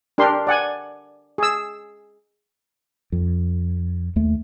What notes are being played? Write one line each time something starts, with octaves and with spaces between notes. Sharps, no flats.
D4 G4 A#4 C6
D5 F#5 G#5
G#4 E6
F2
D#2 A3